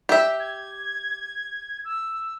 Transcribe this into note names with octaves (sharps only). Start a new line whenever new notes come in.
G4 E5
G#6
E6